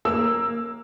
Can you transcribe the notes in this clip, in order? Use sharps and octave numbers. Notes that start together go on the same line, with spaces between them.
A#3 E6